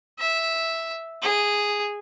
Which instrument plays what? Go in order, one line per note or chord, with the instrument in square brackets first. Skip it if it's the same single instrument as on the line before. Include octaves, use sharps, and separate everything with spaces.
[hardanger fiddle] E5
G#4